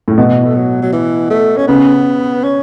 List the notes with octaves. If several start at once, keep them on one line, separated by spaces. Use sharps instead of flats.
A2 C#3
B2 E3
A3
F#3
F#3
E3
A3
C#4
C#3 B3
C#4